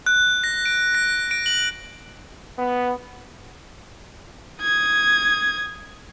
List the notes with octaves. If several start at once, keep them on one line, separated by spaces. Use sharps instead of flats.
F#6
A#6
D7
A#6
D7
F#7
B3
D#6 G#6